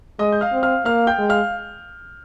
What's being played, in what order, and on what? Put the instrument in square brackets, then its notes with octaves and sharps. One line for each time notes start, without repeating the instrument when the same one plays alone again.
[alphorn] G#3 [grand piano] D#5 D#6
[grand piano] G6
F5 F6
[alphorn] C4
[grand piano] F5 F6
[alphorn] A#3 [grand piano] F5 F6
[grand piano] G5 G6
[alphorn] G#3
[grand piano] F5 F6